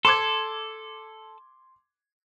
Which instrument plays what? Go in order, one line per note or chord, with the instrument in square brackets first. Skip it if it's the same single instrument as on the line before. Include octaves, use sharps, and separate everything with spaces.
[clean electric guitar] A4 [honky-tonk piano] C6 D6 G#6